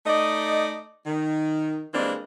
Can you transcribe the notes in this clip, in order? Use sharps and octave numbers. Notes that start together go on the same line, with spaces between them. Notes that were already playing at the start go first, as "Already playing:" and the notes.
A3 D#4 D5 D#5
D#3
E3 G3 G#3 A#3 C4 D4